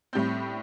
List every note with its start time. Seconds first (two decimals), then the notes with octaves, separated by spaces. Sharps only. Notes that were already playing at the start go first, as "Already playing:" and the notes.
0.13 A2 G3 C4 G6